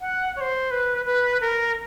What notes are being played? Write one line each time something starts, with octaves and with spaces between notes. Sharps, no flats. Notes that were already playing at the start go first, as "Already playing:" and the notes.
F#5
C#5
C5
B4
B4
A#4